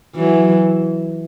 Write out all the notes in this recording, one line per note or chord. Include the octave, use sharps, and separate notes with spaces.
E3 F#3